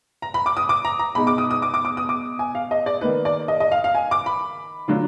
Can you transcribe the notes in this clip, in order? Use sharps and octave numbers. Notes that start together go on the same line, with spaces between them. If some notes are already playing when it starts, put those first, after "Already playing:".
A#5
B5
D6
D#6
D6
A#5
A#5
B2 G#3 D#4 B5
D6
D#6
D#6
D6
D6
D6
D#6
D6
G#5
F5
D#5
D5
D#3 A#3 D#4 B4
D5
D#5
D#5
F5
F5
G#5
D6
B5
D3 F#3 D4 F4